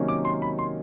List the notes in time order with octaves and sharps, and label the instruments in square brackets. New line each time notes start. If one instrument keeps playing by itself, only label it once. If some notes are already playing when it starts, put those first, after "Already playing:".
Already playing: [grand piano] C3 D#3 F#3 A#3 C#4
D6
C6
B5
C6